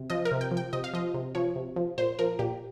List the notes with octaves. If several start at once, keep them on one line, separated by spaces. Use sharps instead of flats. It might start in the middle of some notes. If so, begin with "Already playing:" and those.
Already playing: C3
F3 D#5
A#4
C3
G5
F3
G5
C3 D#5
F5
F3 D#5
C3
F3 C#5
C3
F3
A#2 C5
F3 A#4
A#2 G4